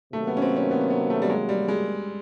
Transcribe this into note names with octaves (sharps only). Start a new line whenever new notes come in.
C3 D#3 F#3 A3 A#3
B3
C#4
C4
C#4
B3
B3
A3
G3
G#3
G3
G#3